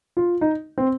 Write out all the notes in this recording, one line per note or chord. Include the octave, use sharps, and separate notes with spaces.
F4
D#4
C4